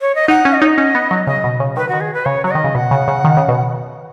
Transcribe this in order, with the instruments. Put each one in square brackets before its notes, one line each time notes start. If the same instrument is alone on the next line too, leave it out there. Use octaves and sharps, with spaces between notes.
[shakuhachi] C#5
D#5
[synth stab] D#4 [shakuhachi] F#5
[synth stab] C#4
[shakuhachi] D#5
[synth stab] D#4 [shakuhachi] C#5
[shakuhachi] D#5
[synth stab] C#4
B3
F#3
[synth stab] C#3 [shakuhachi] D#5
[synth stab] B2
C#3
[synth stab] D#3 [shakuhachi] B4
[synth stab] D#3 [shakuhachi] F#4
[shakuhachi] G#4
B4
[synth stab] C#3 [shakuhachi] C#5
[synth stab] F#3 [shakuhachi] C#5
[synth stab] D#3 [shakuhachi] D#5
[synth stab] C#3
[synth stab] B2 [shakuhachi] F#5
[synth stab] C#3
C#3
D#3
C#3
B2